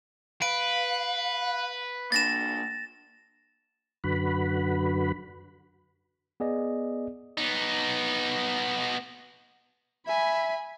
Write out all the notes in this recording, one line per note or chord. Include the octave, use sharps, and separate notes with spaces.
B4 F5 D7
A#3 D4 A6 A#6 E7
F#2 D3 F#4 B4 B5
B3 G#4 D5 D#5
B3 D#4
E5 G#5 B5